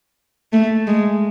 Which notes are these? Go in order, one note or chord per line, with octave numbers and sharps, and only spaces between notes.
A3
G#3